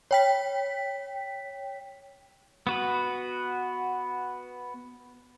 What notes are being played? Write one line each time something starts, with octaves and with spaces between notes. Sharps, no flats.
C#5 G5 B6
B3 F#4 B4